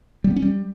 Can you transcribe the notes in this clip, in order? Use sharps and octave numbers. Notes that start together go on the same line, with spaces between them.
G3
B3
C#4
G3